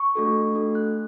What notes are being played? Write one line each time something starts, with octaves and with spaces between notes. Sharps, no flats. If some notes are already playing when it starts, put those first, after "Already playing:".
Already playing: C#6
A3 D4 F#4 A4
A3 D4 F#4 A4
F#6